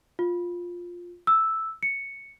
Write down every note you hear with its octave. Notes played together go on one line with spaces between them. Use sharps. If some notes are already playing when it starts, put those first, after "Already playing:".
F4
E6
C#7